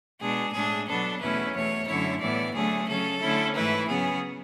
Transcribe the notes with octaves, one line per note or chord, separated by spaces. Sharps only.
B2 G#3 D4 G#4
A2 G#3 D4 G#4
B2 F#3 B3 D4 A4
E2 B2 A3 C#4 E4 B4
E2 B2 A3 C#5
F#2 D3 A3 E4 C#5
A2 E3 B3 E4 D5
D2 D3 F#3 A3 D4 G#4
C#3 F#3 C#4 A4
D3 A3 C#4 E4
G#2 E3 A3 E4 B4
C#3 F#3 B3 G#4